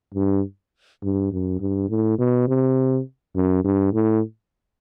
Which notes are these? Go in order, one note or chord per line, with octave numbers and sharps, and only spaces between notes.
G2
G2
F#2
G2
A2
B2
C3
F#2
G2
A2